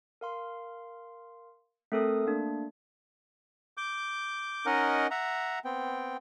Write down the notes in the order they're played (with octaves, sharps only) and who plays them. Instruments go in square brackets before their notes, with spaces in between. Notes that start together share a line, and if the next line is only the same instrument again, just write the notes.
[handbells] A#4 F5 C6
A3 C4 A4 A#4 D#6
A3 A#3 D4
[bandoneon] D6 G6
C#4 D#4 A#4 D#5 F#5
E5 F#5 A#5
B3 C4 G5